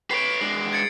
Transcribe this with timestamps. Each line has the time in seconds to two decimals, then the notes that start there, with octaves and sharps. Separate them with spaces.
0.11 B4 C#5 C7 D7
0.41 G#3 D4
0.73 G#6 A6 C#7